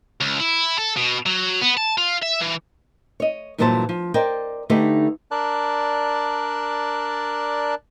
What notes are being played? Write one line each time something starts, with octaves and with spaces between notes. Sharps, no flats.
C#2
E4
A4
B2
F#3
B3
A5
F4
E5
E3
C#5 D#5
G2 A#2 E3 F#3 C5 A5
F3
A#4 C5 D5 D#5 G5
D3 A3 D#4 G4 B4
D4 A#4 D5 A5 F#6